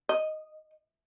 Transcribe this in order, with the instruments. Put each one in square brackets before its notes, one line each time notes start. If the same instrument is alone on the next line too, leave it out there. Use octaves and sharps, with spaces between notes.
[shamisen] D#5